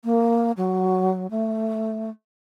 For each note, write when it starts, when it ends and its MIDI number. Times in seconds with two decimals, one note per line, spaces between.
0.04 0.52 58
0.57 1.27 54
1.30 2.10 57